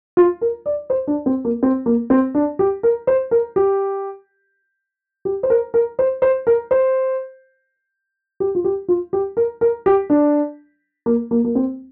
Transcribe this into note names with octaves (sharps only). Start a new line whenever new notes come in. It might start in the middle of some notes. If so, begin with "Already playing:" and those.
F4
A#4
D5
C5
D4
C4
A#3
C4
A#3
C4
D4
G4
A#4
C5
A#4
G4
G4
C5
A#4
A#4
C5
C5
A#4
C5
G4
F4
G4
F4
G4
A#4
A#4
G4
D4
A#3
A#3
A#3
C4